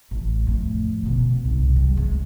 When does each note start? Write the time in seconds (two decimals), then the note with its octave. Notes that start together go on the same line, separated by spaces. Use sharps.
0.11 A1
0.47 F2 A2
1.03 B2 D3
1.44 C2 G#2
1.76 G3
1.96 C#2 G#3